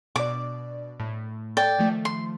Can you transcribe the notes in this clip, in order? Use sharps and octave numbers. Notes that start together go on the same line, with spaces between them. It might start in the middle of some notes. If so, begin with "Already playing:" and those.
B2 D4 D5 D6
A2 A3
A4 D5 G5 G#6
D#3 F3 A3
C6